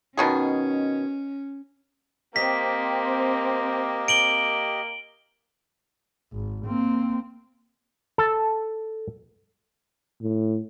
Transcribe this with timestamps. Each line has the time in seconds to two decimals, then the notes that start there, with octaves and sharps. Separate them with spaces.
0.17 B2 D#3 C#4 G#4
2.36 A#3 C4 G4 D#5 B6
4.08 D7 F#7 G7
6.33 G#1
6.66 A#3 C4
8.18 A4
10.22 A2